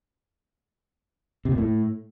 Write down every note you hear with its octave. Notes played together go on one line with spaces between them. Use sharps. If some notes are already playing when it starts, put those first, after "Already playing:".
C3
A#2
A2